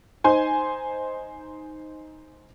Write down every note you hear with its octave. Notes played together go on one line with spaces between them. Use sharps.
D#4 C5 G#5